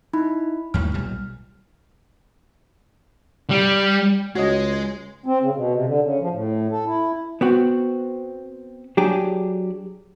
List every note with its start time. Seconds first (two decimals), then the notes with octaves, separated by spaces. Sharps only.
0.13 D#4 E4 B5
0.74 D#2 A2 D#3 F6
0.94 B1 A#2 G3
3.50 G3
4.35 C#2 G#3 F#4 C#5 D#5
5.26 C4
5.43 C#3
5.55 B2
5.73 C3
5.86 D3
6.02 C#3
6.19 F3
6.31 A2
6.71 A4
6.87 E4
7.41 B3 C4 F#4
8.97 F#3 D4 G4 G#4